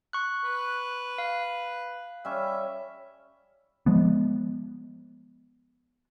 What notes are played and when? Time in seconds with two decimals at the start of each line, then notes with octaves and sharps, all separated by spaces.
0.13 C#6 F#6
0.44 B4
1.18 F5
2.25 G3 C#4 E5
3.86 F3 G#3 B3